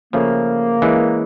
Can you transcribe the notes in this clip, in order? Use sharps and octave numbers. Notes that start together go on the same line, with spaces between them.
C#3 F3 A3 A#3 C#4
E3 G#3 C#4